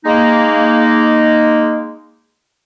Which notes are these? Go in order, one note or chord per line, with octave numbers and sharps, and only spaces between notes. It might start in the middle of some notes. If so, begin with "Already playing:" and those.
G#3 A#3 D#4